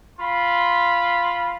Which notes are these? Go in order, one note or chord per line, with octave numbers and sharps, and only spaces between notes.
F4 B5 C6